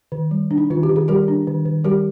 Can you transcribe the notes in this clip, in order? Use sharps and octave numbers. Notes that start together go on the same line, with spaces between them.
D#3
G3
D4
D#4
D#3 F4
G4
D#3
G#4
G3 G4 A#4
D4
D#3
D#3
G3 G4 A#4